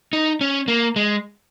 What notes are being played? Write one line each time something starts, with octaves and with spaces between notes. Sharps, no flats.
D#4
C#4
A#3
G#3